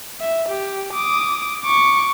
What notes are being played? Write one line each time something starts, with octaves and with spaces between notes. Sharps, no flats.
E5
G4
D6 D#6
C#6 D6